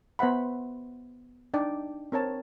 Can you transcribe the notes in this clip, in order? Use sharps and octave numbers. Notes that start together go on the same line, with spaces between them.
B3 C5 E5 F#5 B5
D4 D#4 D5 G5
C4 A#4 C#5 A5